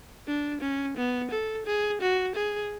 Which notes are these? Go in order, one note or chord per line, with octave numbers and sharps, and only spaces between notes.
D4
C#4
B3
A4
G#4
F#4
G#4